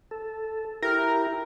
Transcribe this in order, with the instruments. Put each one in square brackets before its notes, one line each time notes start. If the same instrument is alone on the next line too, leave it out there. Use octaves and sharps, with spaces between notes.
[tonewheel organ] A4
[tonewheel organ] E4 G4 [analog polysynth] A#4